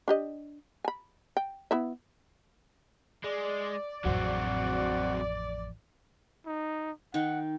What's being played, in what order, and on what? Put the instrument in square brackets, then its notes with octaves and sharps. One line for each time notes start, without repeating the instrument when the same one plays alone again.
[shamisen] D4 G4 D#5
G#5 B5
G5
B3 E4 E5
[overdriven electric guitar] G#3 [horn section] D5
[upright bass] A1 F2 [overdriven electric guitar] F#3 C4 [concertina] F#4
[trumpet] D#4
[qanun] D#3 D#4 [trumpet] F#5